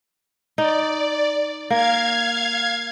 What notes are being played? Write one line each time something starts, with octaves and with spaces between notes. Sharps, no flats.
D#4 D5
A#3 F5 G#6